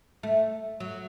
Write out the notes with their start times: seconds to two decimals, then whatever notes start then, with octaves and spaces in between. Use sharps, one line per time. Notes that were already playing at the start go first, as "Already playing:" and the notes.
0.23 A3
0.80 F#3